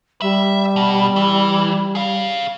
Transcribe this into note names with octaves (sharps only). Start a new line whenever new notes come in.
G3 E5
B2
E3
G#4 F5